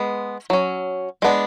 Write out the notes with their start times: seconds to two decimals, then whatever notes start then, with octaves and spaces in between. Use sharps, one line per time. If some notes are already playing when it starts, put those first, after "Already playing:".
Already playing: G#3 B3
0.50 F#3 C#4
1.22 G#3 B3 D4